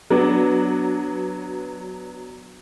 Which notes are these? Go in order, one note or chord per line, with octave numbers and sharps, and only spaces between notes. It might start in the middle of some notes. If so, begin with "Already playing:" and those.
F#3 B3 D4